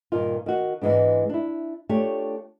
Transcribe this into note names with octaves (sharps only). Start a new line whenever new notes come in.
G2 A#2 D#3 F4
D#3 F#4
G#2 E3 G#3 B3 D4
D4 E4
A3 D4 F4 G4 C#5